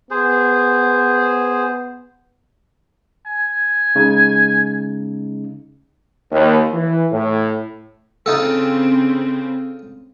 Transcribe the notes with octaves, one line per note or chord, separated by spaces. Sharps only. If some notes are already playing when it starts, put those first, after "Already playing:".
B3 G#4 C5
G#5
C#3 G#3 D#4
D#2
E3
A2
C#3 C4 D#4 F4 A4